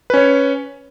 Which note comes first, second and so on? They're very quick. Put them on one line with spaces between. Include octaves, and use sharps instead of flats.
B4 C#4 C#5